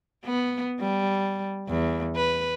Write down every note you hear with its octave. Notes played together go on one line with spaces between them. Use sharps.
B3
G3
E2
B4